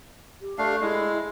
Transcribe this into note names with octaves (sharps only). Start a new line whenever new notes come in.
G4
A3 D4 F5
G#3 E4